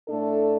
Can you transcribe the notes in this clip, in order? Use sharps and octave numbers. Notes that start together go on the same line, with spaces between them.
A2 A3 D4 A4